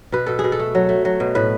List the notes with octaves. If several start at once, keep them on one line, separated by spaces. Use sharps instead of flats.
B2 B4
B2 A4
G#4
B2
A4
A3
F#3
A3
F#3
B2
A2 B4